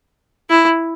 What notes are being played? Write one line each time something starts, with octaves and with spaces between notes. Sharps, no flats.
E4